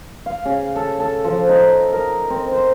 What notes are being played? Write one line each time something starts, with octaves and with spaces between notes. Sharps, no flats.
F5
C#3
A4
A4
F3
D#4
A#4
C4
C5